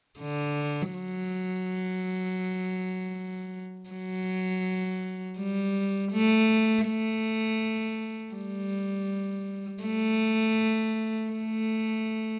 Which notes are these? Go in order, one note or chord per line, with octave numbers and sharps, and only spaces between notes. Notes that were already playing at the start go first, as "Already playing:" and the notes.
D3
F#3
F#3
G3
A3
A3
G3
A3
A3